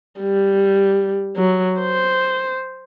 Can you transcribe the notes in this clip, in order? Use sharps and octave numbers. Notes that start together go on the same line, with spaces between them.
G3
F#3
C5